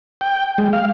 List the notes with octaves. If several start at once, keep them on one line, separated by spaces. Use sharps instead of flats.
G5
G#3
F5